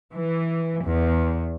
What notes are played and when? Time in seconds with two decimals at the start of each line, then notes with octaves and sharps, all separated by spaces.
0.13 E3
0.83 E2